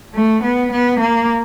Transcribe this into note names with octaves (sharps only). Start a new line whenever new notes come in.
A3
B3
B3
A#3